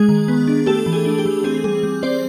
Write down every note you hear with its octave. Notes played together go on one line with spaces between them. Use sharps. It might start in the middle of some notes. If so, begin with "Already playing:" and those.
Already playing: G#3 G#4
D#3
B3
D4
A3 G4 A4
E3
G#4
D4
G4
E3
C4 G#4
G3 G#4
G3
C4 C5 D5